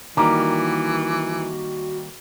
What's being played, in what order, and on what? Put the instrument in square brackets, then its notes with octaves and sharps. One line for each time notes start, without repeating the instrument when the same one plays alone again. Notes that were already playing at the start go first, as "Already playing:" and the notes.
[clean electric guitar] D#3 G3 A#3 [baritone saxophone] E3 [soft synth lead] F#4 [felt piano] A#5 D6